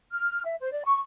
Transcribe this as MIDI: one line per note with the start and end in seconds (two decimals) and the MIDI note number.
0.11 0.43 89
0.44 0.54 76
0.60 0.69 72
0.72 0.82 74
0.84 0.99 85